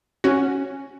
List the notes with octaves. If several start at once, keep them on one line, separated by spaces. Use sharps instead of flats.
C#4 F#4